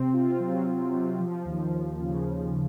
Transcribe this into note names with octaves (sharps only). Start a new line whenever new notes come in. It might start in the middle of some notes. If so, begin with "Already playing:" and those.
Already playing: C3 C4
F4
F#3
C4
C3
F3
D#2
D#2
C#3
F3